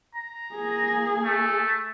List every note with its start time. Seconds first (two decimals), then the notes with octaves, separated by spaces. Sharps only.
0.15 A#5
0.55 A#3 G#4
1.24 A3